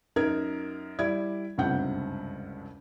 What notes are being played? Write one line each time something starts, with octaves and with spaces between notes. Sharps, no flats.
F#2 D#4 A#4 G#6
G3 E4 D5 G#6
F#1 C#2 G2 C3 F#5 G6